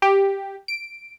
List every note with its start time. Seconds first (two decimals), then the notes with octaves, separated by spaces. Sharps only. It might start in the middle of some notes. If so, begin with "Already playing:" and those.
0.02 G4
0.68 D7